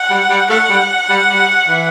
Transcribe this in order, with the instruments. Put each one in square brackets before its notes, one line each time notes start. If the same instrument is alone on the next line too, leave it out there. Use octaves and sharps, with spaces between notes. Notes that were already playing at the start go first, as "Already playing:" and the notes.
Already playing: [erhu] F#5
[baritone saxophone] G3
G3
[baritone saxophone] A3 [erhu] F#5
[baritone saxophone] G3
G3
G3
E3